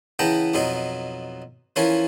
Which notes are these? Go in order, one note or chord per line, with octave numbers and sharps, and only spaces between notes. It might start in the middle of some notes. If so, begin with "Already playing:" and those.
C#3 E3 B3 G5 A5 A#5
F2 B2 F#3 D#4
E3 F3 C#4 A#4 C#5